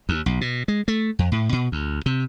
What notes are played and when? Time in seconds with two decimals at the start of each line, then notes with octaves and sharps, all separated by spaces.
0.09 D#2
0.26 B1
0.41 B2
0.68 G#3
0.88 A3
1.19 F2
1.32 A2
1.53 B2
1.72 D2
2.06 C3